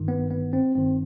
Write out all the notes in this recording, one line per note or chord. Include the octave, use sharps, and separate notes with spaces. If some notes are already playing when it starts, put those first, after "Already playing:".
Already playing: G1 G2 D#3
B3
B3
C4
G1 G2 D#3 C4